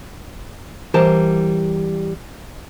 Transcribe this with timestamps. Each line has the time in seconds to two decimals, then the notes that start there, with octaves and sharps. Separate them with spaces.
0.94 E3 G3 A#4 C5 A5